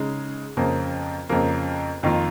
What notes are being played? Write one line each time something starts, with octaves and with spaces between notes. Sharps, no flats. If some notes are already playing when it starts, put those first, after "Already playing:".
Already playing: C#3 G#3 D#4
F2 C#3 F3 A#3
F2 C#3 F3 A#3
F2 D#3 A#3 F4